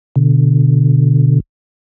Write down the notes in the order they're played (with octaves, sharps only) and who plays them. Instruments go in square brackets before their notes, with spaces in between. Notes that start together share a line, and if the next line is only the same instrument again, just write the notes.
[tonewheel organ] B2 D3